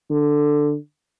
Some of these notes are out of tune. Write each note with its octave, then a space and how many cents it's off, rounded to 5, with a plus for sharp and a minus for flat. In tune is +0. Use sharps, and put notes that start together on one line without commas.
D3 +5